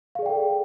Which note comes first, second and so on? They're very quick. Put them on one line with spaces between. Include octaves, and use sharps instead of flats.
F5 G#4 D5 G5 A4